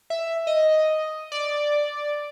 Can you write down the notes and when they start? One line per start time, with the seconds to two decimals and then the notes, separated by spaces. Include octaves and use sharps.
0.10 E5
0.47 D#5
1.32 D5